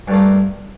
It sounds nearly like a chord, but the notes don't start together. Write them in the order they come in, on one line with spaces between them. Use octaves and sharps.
G2 A3 A#3